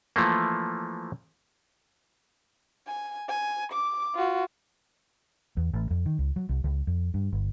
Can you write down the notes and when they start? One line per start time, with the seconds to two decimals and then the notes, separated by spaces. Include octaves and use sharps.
0.16 E3 F3 A3 A#3
2.87 G#5
3.29 G#5
3.72 D6
4.15 F4 F#4
5.57 E2
5.74 A1
5.91 F2
6.06 D#3
6.19 C#2
6.36 F#3
6.49 C2
6.64 C#2
6.87 F2
7.14 G2
7.32 G1